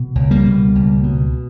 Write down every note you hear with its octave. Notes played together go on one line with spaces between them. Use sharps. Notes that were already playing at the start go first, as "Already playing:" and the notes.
Already playing: B2
C#2
G3 A#3
B2
C#2
B2